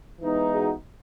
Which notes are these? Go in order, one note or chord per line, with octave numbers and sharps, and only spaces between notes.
E3 G#3 B3 D#4
F#4 G#4